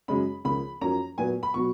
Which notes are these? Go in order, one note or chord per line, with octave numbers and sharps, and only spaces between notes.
F#2 C#3 G#3 C#4 B5
C#2 C#3 F3 A#3 B5
F#2 F3 A#3 C#4 A#5
A#2 F#3 B3 G#5
B5
B2 F#3 C#6